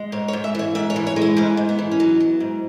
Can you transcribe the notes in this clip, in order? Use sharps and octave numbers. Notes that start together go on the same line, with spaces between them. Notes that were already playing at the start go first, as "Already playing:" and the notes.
Already playing: G#3
G#2 C#5
C#5
G#2
E5
E3 C#5
G#2 E5
C#5
E3
C#5
G#3
E4
G#2 C#4
G#2
B3
E3
C#4
F#3 B3
F#3
G#2